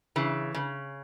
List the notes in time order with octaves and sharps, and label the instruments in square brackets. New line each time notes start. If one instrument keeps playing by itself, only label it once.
[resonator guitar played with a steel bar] C#3 E3
C#3